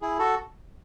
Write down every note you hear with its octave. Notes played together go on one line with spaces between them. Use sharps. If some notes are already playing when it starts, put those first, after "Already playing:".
E4 G#4
F#4 A4